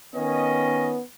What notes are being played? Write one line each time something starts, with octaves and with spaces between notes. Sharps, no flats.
D#3 B3 C#4 D#5